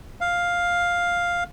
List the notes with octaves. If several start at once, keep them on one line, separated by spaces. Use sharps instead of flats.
F5